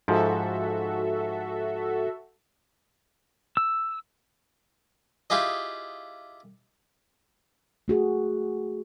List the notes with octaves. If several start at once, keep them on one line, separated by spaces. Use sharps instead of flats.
G#2 F3 F#4 A4 E5
E6
E4 F4 G4 G#4 D#5
A3 F#4 G#4